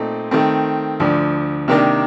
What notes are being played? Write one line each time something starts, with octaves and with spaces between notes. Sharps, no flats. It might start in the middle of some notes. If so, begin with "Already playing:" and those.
Already playing: A#2 A3 C4 D#4
D#3 A3 C4
D2 D3 F3
C3 D#3 A#3 D4 G4